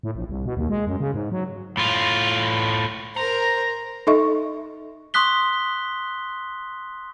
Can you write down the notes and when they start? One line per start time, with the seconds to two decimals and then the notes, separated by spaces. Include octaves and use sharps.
0.03 A2
0.15 A#1
0.29 C2
0.46 B2
0.57 D#2
0.70 G#3
0.87 F#2
1.00 C#3
1.14 G#2
1.32 F#3
1.77 A2 F4
3.16 A#4 C5 A#5
4.07 D#4 A4 D#5 E5 C#6
5.14 C6 C#6 D#6 F#6 B6 G7